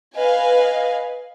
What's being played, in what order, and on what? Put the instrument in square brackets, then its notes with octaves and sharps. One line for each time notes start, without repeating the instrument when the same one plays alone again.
[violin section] B4 F5 G#5 [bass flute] D#5